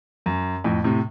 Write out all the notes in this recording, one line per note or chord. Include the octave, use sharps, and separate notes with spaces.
F#2
F2 A2
A2 C3